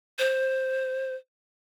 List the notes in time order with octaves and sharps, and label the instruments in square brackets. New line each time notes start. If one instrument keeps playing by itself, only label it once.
[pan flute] C5